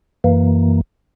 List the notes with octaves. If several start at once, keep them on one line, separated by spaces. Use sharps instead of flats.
F#2 E3 A#3